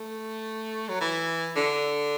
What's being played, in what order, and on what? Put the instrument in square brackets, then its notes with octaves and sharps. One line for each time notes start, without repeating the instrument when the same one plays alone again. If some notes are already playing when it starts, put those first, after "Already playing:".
Already playing: [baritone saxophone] A3
F#3
E3
D3